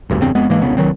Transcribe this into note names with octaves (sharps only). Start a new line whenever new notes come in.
G#1 D2 G2
E2 G2 C#3 C4
F2 G#3 B3
G#2 E3 G#3 A#3
E1 C2 C#3 B3
C2 D#3 F#3 C4